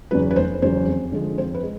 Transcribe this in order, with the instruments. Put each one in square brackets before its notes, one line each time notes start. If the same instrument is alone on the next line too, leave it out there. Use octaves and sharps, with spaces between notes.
[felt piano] E2 C#3 F#3 B4
B4
F1 C5
E2 C#3 F#3 C5
F2
D3 F3 G#3
F2 C5
B4
G#3